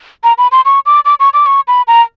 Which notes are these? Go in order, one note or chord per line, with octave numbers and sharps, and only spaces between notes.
A#5
B5
C6
C#6
D6
D6
C#6
D6
C#6
B5
A#5